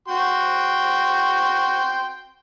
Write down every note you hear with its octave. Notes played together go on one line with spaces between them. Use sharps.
F#4 G5 C6